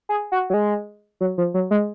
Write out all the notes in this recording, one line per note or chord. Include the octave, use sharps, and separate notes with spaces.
G#4
F#4
F#3
G#3
F#3
F3
F#3
G#3